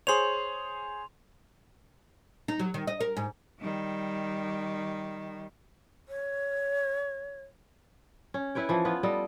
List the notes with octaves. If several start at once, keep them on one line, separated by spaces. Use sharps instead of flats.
G#4 C5 C#5 C6 F7
D#4
F#3
D#3
D#5
A#4
G#2
D#3 G3
C#5
C#4
E4 B4 C#5 G5
E3 F3
B3 F4 B4
G3 A4 D#5